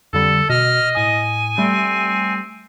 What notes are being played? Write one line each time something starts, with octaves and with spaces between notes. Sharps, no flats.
F2 D3 G3 A4
B2 D#5 F6
A2 G#5 D#6
G3 A3 C4